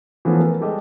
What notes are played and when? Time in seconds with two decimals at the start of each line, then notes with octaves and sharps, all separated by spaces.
0.25 E3 F3 A3 B3 C#4
0.40 A#4 B4
0.61 G3 G#3 G4 A4 D#5